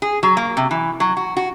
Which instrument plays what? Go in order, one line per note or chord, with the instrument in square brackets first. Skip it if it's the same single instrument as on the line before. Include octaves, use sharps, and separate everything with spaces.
[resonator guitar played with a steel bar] G#4
F#3
A#3
C3
E3
F#3
F#4
F#4